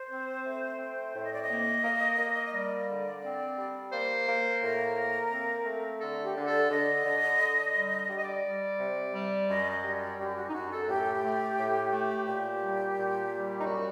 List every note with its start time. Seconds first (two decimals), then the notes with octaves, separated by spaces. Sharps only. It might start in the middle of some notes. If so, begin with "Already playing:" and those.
Already playing: C5
0.10 C4
0.45 A3
0.79 C4
1.15 A2
1.23 D#5
1.33 D5
1.42 D#5
1.49 A#3
1.84 A#3
2.19 A#3
2.46 D#5
2.53 G3 D5
2.89 D3
3.23 C4
3.57 G3
3.92 A#3 C5
4.27 A#3
4.62 A2 A#4
4.97 A#3
5.31 C4
5.66 A3
6.00 D3 A4
6.24 G4
6.36 D3
6.47 A4
6.70 D3 D#5
7.05 D3
7.40 D3
7.75 G3
8.09 G3 D5
8.17 D#5
8.24 D5
8.44 G3
8.78 C3
9.13 G3
9.48 F#2 D#5
9.71 D#5
9.84 G3
9.95 D5
10.18 F#2 G4
10.36 F#4
10.49 D#4
10.53 F#2 F#4
10.71 A4
10.88 A2 G4
11.23 A3
11.58 A2
11.92 A3
12.26 A#2 G4
12.61 G3
12.97 A#2
13.31 G3
13.61 D#4
13.65 F#2 F#4